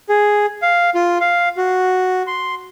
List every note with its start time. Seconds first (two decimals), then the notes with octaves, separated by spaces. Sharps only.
0.09 G#4
0.62 F5
0.95 F4
1.21 F5
1.57 F#4
2.27 C6